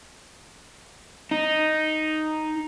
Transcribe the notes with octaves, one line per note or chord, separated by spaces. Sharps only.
D#4